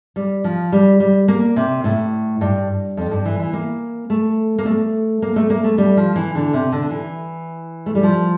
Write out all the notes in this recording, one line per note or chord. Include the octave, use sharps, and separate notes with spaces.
G3
F3
G3
G3
A#3
C3
A2
G2
F2
G2
E3
E3
A#3
A3
A#3
A3
A#3
A3
A#3
A3
G3
F3
E3
D3
C3
D3
E3
A3
G3
F3